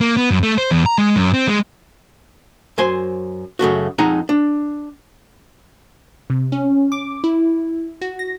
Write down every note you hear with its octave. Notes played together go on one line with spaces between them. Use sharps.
A#3
B3
F#2
A3
C5
E2
A#5
G#3
F#2
C4
G#3
F#2 C5 G#5 C6
F#2 C#3 A3 F#4
F2 G#3 D#4 F#5 G#5 A#5
D4
C3
C#4
D6
E4
F#4
A#6